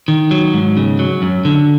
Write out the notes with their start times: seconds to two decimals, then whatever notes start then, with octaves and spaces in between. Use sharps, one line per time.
0.08 D#3
0.31 F#3
0.54 G#2
0.77 C#3
0.99 F#3
1.22 F#2
1.45 D3